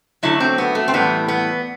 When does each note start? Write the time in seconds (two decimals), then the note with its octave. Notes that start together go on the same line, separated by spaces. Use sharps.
0.23 D3 F#3 A3 E4
0.40 C4
0.58 B3
0.75 A3
0.88 C4
0.94 A2 E3 G3 B3
1.28 B3